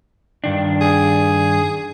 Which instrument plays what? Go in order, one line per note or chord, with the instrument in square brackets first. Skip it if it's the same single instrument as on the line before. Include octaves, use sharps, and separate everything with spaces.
[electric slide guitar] G2 D#3 D4
[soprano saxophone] G#4